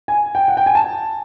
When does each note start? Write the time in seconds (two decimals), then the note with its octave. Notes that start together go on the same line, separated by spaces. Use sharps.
0.08 G#5
0.35 G5
0.48 F#5
0.57 G5
0.66 G#5
0.75 A5